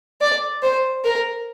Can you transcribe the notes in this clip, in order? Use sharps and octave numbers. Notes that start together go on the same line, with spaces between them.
D5
C5
A#4